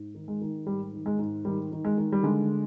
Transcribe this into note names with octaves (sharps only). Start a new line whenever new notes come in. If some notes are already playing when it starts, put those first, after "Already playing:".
Already playing: G#2
D#3
G#3
D#3
G#2 G3
D#3
G#3
G#2
D#3 G3
D#3
G#3
D#3
G3
D3 G#3